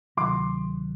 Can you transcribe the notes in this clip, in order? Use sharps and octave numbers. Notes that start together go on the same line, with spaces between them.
D2 C3 D#3 F#3 C6 D6